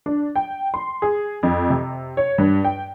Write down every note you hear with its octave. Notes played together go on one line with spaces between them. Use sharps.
D4
G5
C6
G#4
F2
C3
C#5
G2
G5